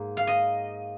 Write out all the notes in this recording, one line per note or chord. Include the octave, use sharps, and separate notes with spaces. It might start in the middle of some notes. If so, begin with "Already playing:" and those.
Already playing: G#2 A#3
F5
D#5